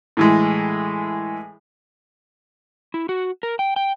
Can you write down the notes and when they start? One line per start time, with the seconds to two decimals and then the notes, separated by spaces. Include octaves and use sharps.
0.17 A2 E3 G#3
2.94 E4
3.09 F#4
3.43 A#4
3.59 G5
3.76 G5